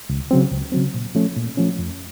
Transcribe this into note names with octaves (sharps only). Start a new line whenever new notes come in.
C#2
C#3 F#3 C4
C#2
C#3 F#3 C4
A#2
F3 A3 C#4
A#2
F3 A3 C#4
F2